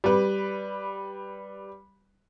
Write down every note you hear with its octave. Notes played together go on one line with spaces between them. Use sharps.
G3 B4